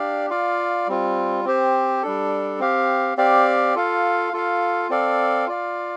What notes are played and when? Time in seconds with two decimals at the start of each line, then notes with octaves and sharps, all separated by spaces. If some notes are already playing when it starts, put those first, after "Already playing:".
Already playing: D4 G4 D5 F5
0.30 F4 D5 F5
0.87 G3 C4 F4
1.45 C4 G4 C5
2.02 G3 D4 A4
2.60 C4 G4 F5
3.17 C4 G4 D5 F5
3.75 F4 A4 F5
4.33 F4 A4 F5
4.89 C4 A4 D5 F5
5.47 F4 D5 F5